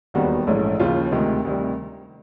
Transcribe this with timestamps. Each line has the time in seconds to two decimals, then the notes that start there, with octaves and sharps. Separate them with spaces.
0.14 E1 D#2 D#3 G3 B3 F#4
0.47 A#1 G#2 E3 A3 C#4
0.80 D#2 C#3 F3 F4
1.11 D2 C3 D#3 G#3
1.45 D2 C3 D#3 G3